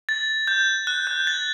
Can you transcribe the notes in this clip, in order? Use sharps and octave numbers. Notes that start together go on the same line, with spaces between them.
A6
G6
F#6
G6
A6